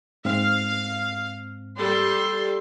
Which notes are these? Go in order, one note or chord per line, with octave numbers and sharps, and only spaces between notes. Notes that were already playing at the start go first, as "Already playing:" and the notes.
G#2 C4 F5
G3 A4 C6